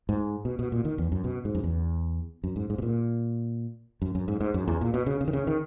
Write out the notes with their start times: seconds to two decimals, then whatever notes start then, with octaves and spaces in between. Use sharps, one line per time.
0.09 G#2
0.45 B2
0.59 B2
0.72 A#2
0.85 D#3
0.98 E2
1.12 F#2
1.24 B2
1.45 G#2
1.55 F#2
1.64 E2
2.44 F#2
2.56 G#2
2.70 G#2
2.78 B2
2.82 A#2
4.02 F#2
4.15 F#2
4.28 G#2
4.41 G#2
4.54 F#2
4.68 E2
4.81 A#2
4.94 B2
5.06 C#3
5.21 C#3
5.28 D#3
5.33 C#3
5.47 D#3